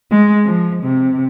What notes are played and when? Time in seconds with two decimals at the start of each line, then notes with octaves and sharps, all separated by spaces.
0.11 G#3
0.45 F3
0.84 C3